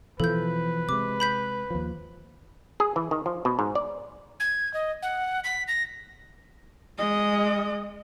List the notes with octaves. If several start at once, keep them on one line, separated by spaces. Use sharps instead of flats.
B2 E3 F3 A4 B4 G6
C3 G#3 D6
B5 G6 B6
D#2 F3
G#4
E3
D#3
F3
B2
G#2
D5
G#6
D#5
F#5
B6
A#6
G#3 D#5